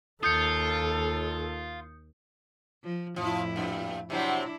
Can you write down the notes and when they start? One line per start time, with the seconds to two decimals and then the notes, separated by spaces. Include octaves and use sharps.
0.23 D#2 F4 A4 D#6 G6 C#7
2.83 F3
3.16 F2 A2 F3 E4
3.56 G2 A#2
4.10 C3 F#3 C4 D4 E4